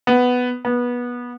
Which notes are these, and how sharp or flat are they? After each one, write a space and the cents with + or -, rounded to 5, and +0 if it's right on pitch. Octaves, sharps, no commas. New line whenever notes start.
B3 +5
B3 -20